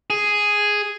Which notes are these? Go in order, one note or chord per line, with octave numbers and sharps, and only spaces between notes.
G#4